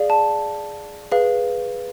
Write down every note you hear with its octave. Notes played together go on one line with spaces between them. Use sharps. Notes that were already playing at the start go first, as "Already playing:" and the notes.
Already playing: G#4 D5 F5
A5
G#4 B4 F5